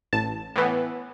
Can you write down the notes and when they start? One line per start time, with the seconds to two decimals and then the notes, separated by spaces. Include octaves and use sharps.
0.13 A1 A5
0.56 A2 E3 B3